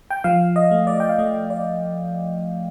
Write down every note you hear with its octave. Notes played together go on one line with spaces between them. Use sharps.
G5
F3 F5
D#5
A3
D5
G5
F5
A3 D#5
D5